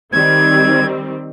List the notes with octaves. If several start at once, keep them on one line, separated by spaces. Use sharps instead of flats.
D#3 G3 C4 G#6